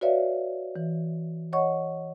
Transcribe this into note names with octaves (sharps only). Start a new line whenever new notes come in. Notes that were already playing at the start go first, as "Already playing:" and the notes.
F#4 B4 C#5 D5 E5 F5
E3
C#5 D#5 F#5 C#6